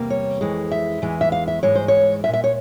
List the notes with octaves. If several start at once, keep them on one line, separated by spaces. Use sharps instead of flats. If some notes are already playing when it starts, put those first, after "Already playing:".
Already playing: E2 C3 G3 A#3
C#5
F2 E3 G#3
E5
E2 E3 G#3
E5
F5
E5
G#2 E3 G#3 C#5
C5
C#5
A#2 F3 G#3 E5
E5
C#5